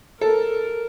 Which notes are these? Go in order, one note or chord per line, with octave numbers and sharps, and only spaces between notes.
A4 A#4